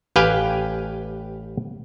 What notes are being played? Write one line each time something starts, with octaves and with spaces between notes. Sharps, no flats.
A1 G4 B4 F5 G5 G#5